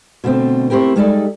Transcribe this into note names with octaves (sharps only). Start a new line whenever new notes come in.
B2 D3 A3 C4
A3 C4 E4 G4 A#4
G3 G#3 D#4 A4 D5 E5